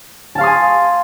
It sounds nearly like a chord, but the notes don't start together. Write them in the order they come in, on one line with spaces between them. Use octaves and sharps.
A5 F5 C6 D#6 G#5